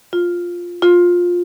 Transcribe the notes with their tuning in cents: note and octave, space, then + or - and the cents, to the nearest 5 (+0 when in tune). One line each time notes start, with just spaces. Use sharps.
F4 +5
F4 +15